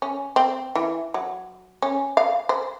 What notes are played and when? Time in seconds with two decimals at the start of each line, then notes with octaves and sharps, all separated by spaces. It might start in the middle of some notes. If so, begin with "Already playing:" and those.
0.02 C#4
0.36 C4
0.75 E3
1.14 F#3
1.82 C#4
2.17 F5
2.49 C5